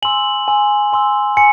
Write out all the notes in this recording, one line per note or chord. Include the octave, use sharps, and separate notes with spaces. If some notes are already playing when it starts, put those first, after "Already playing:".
G#5 C6 E6 F#7
G#5 C6 E6
G#5 C6 E6
G#5 C6 C#7